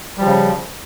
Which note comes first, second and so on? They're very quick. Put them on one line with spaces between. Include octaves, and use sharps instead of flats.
G3 F3 C#3